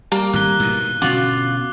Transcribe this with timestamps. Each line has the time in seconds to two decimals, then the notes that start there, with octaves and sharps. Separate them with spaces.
0.12 G3 A#3
0.33 G#1 A2 F#6 G7
0.60 G#2 B2 E3
1.02 B2 D3 C#4 F4 F#4 D6 F#6